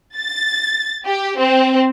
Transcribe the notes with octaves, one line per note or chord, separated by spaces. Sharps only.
A6
G4
C4